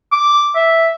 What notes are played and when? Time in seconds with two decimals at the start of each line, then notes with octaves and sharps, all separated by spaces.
0.12 D6
0.55 E5